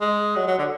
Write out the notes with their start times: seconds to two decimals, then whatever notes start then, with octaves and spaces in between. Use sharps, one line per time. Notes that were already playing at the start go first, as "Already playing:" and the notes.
0.01 G#3
0.36 F#3
0.47 F#3
0.58 D3